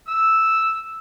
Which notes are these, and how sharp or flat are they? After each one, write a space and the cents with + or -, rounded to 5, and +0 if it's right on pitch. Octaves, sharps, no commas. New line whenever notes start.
E6 -5